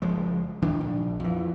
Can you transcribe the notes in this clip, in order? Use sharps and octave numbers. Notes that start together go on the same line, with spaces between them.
F#1 F3 G#3
D2 D#3 D4
A#1
F2 E3